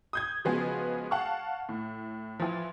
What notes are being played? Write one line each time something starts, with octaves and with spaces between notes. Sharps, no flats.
D#6 G6 G#6
C#3 F3 G#3 B3 F#4 G#4
F5 F#5 A5 C#6 F6
A2
E3 F3